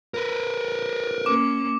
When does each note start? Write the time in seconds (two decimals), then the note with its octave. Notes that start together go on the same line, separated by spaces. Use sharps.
0.14 A#4 B4
1.26 A#3 C#4 D6